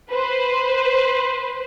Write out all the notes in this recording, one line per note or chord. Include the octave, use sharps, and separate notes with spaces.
B4 C5